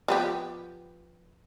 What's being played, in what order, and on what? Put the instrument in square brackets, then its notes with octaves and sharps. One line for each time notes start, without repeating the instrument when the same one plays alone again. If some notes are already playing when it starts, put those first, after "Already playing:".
[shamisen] F3 B3 G4